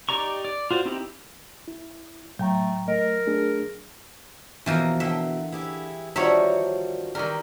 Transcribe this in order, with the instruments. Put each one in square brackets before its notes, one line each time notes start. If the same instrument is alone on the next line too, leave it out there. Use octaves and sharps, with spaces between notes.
[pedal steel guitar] D#4 G4 D5 A#5 C#6
D5
F4 F#4 C5 D5
C4 D#4 E4 G4
[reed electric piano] E4
[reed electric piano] A2 G5 A#5 [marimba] F#3 [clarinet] A3
[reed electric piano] A3 [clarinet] A#4 [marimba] D#5
[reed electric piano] A3 D4 G#4
[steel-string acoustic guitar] B2 A#5 [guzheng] E3 F3 A#3
[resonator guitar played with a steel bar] D3 G5 [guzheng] E5
[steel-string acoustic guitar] E4 G4 G#4
[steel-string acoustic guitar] D#3 F3 F#4 [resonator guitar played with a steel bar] G3 D4 A#5 [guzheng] C#5 E5
[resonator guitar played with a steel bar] D#3 E3 G3 [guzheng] A#4